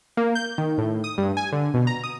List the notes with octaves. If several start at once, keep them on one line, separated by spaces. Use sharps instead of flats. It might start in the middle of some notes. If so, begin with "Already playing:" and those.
A#3
G6
D#3
A2
D#6
G2
G#5
D3
B2
A#5
D#6